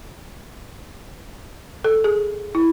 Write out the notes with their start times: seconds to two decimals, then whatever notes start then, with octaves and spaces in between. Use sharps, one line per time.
1.84 A4
2.04 G#4
2.55 E4